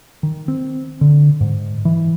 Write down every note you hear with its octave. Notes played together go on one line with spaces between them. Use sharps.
D#3
C4
D3
G#2
E3